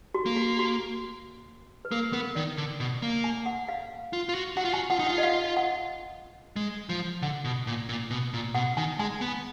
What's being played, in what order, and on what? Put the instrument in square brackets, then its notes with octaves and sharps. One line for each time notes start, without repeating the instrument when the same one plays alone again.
[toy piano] F#4
[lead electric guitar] A#3
[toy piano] F#4
F#4
B4
[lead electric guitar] A#3 [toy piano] A#4
[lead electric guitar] B3 [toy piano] A#4
[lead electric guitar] D#3 [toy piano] D5
[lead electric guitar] D3
B2
A#3
[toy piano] G#5
F#5
F5
[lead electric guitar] F4
F4
F#4
[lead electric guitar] F#4 [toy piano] F#5
[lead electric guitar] F4
[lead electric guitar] F#4 [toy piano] G#5
[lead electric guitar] F4 [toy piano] F#5
[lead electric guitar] D#4
[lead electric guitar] F4 [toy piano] F#5
[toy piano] D#5
F5
F#5
[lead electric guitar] G#3
F3
[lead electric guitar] D3 [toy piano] F#5
[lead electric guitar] B2
A#2
A#2
B2
A#2
[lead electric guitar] B2 [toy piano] F#5
[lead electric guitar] D#3 [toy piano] G#5
[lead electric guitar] G#3 [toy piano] G#5
[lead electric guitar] B3